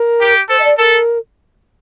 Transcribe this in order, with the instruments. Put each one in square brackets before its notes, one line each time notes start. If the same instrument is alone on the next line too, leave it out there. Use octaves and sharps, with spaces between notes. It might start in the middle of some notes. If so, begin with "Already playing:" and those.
Already playing: [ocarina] A#4
[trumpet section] G4
[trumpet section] A4 [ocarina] C5
[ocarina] D#5
D5
[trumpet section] A4 [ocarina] A#4